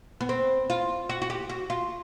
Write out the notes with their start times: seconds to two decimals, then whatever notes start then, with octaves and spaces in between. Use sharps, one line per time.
0.21 B3
0.29 C4
0.70 F4
1.09 F#4
1.22 F#4
1.30 G4
1.49 F#4
1.70 F4